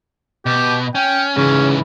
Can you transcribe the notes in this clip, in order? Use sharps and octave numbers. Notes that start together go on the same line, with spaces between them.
B2 G4
C#4 G5
G#2 C#3 E3 C#4